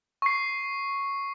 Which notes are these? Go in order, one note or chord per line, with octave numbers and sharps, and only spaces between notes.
C#6 C7